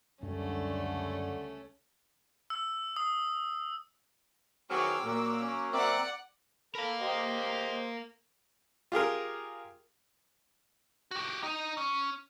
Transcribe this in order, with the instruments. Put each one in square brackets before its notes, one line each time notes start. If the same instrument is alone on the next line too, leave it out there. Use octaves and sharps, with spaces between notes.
[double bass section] C#2 G3 [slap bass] F#2 [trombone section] D3 [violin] A3 C#4
[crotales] E6
D#6
[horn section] D#3 E3 F#3 [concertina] C4 G#4 F6 [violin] D6 E6
[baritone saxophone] A#2 [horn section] F#3 A#3 [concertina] F#4
[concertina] C#4
[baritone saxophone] C4 [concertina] A#4 E5 D6 [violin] D5 F#5
[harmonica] A4 B5 [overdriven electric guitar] A#4 F5
[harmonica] G4 C5 D#5
[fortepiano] F4 G4 G#4 A#4
[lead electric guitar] F#4 G4
D#4
C#4